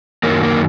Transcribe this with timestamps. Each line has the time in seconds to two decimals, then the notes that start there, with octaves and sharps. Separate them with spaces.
0.23 F#2 D#3 F#3 A#3
0.43 A#3